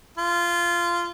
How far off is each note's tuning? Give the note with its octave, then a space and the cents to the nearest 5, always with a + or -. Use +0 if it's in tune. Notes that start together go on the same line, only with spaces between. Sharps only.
F4 -15